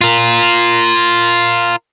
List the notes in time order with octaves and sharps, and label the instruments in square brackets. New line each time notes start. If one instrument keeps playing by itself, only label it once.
[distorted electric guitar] F4 A#4